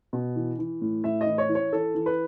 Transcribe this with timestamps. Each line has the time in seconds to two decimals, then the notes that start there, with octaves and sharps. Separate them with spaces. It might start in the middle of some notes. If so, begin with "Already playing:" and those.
0.13 B2
0.36 E3
0.59 E3
0.81 A2
1.04 A2 E5
1.21 D#5
1.27 E3
1.38 C#5
1.50 E3
1.55 C#5
1.72 E3 A4
1.95 E3
2.06 B4